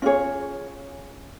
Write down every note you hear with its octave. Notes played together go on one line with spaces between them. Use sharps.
C#4 F4 G#4 C#5